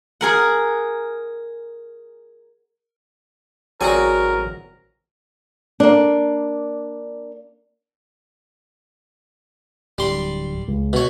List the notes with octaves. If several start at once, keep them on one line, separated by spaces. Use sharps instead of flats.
G#4 A#4 F#5
A1 F#3 C4 F#4 G#4 A#4 D5 G#5
A#3 D4
D1 G3 C6
C#2
B2 C#5